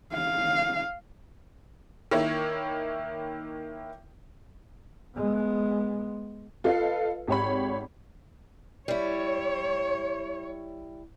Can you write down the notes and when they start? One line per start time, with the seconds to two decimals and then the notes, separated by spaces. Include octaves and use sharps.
0.13 F5
2.11 D#3 A#3 E4 C#5
5.16 G#3 B3
6.64 F4 A4 B4 D#5 F5
7.28 G#1 G4 C#5 B5
8.88 G3 E4 C#5